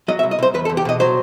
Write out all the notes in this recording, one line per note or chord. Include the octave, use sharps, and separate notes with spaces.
F#3 D#5
E5
C2
D#5
C2 C5
E2 B4
A4
E2
G4
B2 D#5
F#3 C5